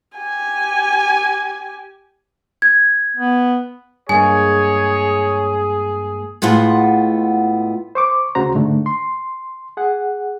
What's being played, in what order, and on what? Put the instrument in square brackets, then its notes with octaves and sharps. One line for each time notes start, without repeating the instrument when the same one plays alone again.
[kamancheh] G4 G#5
[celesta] G#6
[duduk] B3
[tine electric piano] G2 G#3 A#3 [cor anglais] G#4 [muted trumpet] C#5 [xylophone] G#5
[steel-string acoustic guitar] A2 G#3 B3 F4 F#5
[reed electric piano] C5 C#6 D6
D2 C#3 F#4 C5 A#5
G#2 D3 A3
C6
G#4 F#5